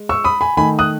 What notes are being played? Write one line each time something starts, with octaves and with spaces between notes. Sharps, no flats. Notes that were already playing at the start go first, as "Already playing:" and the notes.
Already playing: G#3
C#6 E6
B5 D#6
G#5 B5
D#3 A3 G#5 B5
D#6 F#6